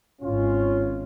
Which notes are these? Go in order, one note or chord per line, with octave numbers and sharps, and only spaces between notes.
G#1 C#4 F4